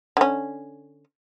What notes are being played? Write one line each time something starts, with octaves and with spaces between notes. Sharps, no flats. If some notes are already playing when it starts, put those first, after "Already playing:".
D3 C#4